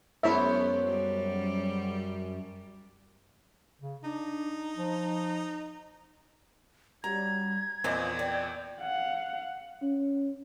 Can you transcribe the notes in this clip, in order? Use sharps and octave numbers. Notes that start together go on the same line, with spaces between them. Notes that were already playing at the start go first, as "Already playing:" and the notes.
F#2 G#3 B3 E4 C5 C#5 E5
G3
C#3
D4 D#4
F3
F#2 G3 A#5 G#6
E2 A#2 E3 F3 C4 D#5
D5 G5
F5 F#5
C#4